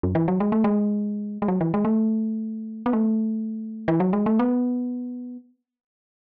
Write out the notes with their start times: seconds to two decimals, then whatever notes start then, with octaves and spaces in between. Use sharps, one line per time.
0.03 F#2
0.15 E3
0.28 F#3
0.40 G#3
0.52 A3
0.64 G#3
1.42 G#3
1.48 F#3
1.61 E3
1.74 G#3
1.85 A3
2.86 B3
2.93 A3
3.88 E3
4.00 F#3
4.13 G#3
4.26 A3
4.39 B3